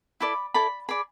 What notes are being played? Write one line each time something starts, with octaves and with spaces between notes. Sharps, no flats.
E4 A4 D5 B5
E4 A4 D5 B5
G#4 D5 B5